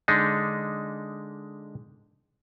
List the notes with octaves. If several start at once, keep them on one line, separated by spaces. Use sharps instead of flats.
D3 G#3 D4 D#4